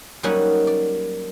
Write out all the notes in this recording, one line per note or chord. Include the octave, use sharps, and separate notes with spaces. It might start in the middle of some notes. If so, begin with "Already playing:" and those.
F#3 G3 A#3 C#4 D#4 F#4
D5